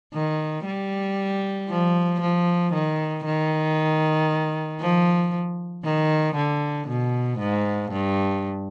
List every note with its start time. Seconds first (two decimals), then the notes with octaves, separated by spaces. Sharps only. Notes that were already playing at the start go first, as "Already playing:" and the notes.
0.13 D#3
0.66 G3
1.69 F3
2.21 F3
2.73 D#3
3.25 D#3
4.80 F3
5.84 D#3
6.36 D3
6.88 B2
7.39 G#2
7.92 G2